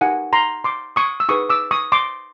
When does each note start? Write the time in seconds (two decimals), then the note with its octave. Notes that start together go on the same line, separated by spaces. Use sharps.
0.01 D#4 G4 A#4 F#5 G#5
0.33 A#5 C6
0.64 C6 D6
0.96 C#6 D#6
1.20 E6
1.29 D#4 G#4 B4 C#6 D#6
1.49 D6 E6
1.71 C#6 D#6
1.92 C6 D6